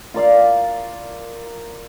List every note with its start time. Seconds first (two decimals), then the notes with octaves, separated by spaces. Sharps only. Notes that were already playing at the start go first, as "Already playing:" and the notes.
0.14 F4 A#4 D5 F5